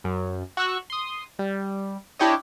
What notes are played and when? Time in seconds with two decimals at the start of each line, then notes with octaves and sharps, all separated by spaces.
0.04 F#2
0.57 F#4 C#6 E6 F#6
0.90 C6 D#6
1.39 G3
2.19 D4 E4 G4 C#5 D#5